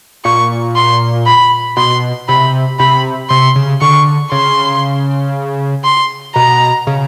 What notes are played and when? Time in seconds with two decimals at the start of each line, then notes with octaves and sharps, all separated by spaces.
0.24 A#2 C#6
0.76 C6
1.26 B5
1.77 B2 C6
2.29 C3 B5
2.79 C3 B5
3.30 C3 C6
3.56 C#3
3.81 D3 C#6
4.32 C#3 C6
5.84 C6
6.35 B2 A#5
6.87 C#3